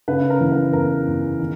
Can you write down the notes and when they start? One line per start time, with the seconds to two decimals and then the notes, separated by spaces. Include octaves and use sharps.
0.08 C#3 B4
0.30 A#4
0.40 E3
0.51 B4
0.73 E2 A#4
1.07 E2
1.39 D#3